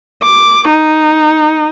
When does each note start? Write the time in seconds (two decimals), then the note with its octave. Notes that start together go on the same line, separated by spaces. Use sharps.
0.23 D6
0.70 D#4